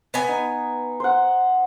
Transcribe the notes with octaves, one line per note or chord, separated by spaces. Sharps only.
B3 G#5
D#4
C5 F#5